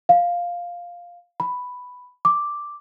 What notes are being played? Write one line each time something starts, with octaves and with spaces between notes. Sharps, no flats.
F5
B5
D6